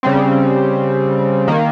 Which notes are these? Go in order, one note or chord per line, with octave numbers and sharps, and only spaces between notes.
C#3 G3 C4
D#3 A#3